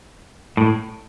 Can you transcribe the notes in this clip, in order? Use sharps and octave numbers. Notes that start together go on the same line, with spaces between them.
A2